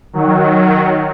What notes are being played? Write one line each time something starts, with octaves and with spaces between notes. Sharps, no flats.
D#3 F#3